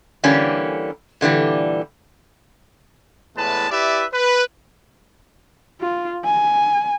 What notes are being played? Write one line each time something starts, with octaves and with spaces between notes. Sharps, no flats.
D3 E3 G3 A#3 C#4
A#2 D3 E3 G3
E2 A2 G#3 B4 A5
E4 G4 B4 D5 E5
B4
F4
G#5